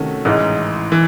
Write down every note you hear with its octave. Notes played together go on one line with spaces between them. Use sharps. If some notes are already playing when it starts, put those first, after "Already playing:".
Already playing: C3 D#3 A3 C#4 F#4
A1 G#2 E3 G#3 D#4
E3